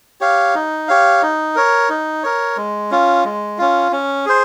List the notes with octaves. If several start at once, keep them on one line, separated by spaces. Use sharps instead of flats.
G4 C#5 F5
D#4
G4 C#5 F5
D#4
A#4 C#5
D#4
A#4 C#5
G#3
C#4 F4
G#3
C#4 F4
C#4
G#4 C5